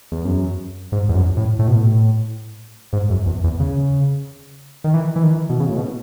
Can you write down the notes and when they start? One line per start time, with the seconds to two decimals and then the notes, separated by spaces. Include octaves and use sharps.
0.12 E2
0.25 F#2
0.92 G#2
1.09 E2
1.15 F#2
1.37 A2
1.59 A2
1.68 B2
1.75 A2
2.93 G#2
3.10 F#2
3.26 E2
3.44 E2
3.60 C#3
4.84 D#3
4.94 E3
5.16 E3
5.24 D#3
5.31 E3
5.49 B2
5.60 C#3
5.69 A2
5.77 B2